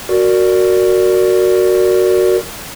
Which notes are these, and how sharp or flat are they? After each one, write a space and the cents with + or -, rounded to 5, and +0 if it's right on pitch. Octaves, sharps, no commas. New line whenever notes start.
F#4 +0 A#4 -10 D5 +0